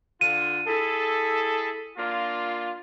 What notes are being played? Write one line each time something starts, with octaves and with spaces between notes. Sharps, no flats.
D3 F4 D#7
E4 G#4 A4
A#3 D4 F4